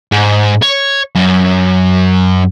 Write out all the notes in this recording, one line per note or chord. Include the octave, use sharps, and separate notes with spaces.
G#2
C#5
F#2